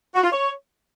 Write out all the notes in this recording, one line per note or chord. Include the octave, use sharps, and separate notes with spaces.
F#4
F4
C#5